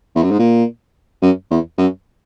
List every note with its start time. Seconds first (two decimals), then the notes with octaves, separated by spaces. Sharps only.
0.15 E2
0.23 F#2
0.31 G#2
0.39 A#2
1.22 F#2
1.50 E2
1.78 F#2